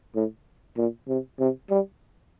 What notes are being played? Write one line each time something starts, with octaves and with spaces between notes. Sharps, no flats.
A2
A#2
C3
C3
G3